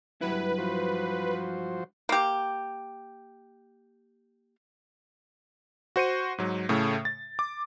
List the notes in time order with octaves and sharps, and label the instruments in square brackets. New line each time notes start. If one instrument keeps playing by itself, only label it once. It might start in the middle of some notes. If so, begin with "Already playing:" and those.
[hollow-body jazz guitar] G2 F#3 E4 [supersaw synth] B4
[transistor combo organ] F3 F#4 C5
[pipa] A#3 G4
[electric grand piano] F#4 C5 C#7 D#7
G#2 F#3
A2 C#3 A3
A6
D6